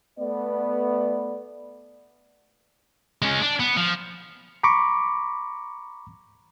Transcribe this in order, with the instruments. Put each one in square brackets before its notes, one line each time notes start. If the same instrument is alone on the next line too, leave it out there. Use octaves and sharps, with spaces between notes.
[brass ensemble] A3 B3 D5
[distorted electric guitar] G#3 C#4
D4
B3
F3
[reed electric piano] A#5 B5 C#6 D6